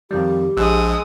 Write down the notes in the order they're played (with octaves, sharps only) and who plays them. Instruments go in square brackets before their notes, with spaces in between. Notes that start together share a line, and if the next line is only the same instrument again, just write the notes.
[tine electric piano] F2 D#3 G3 [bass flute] G4
[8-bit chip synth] A#1 [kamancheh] G#3 D#6 [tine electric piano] E6 F#6